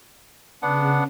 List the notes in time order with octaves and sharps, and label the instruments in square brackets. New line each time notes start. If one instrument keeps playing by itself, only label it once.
[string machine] C#3 [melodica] B3 D4 F#5